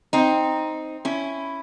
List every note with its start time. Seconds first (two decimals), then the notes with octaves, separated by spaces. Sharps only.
0.13 C4 D#4
1.05 C#4 E4